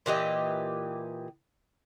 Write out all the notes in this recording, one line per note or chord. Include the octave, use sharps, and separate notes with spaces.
A#2 E3 G4 D#5